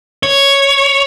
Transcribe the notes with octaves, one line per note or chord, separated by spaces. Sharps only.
C#5